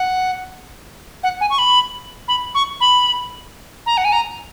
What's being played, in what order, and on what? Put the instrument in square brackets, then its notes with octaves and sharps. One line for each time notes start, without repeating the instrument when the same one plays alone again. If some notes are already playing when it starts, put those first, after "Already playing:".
Already playing: [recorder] F#5
F#5
G#5
C#6
B5
B5
C#6
B5
A#5
F#5
G#5
A#5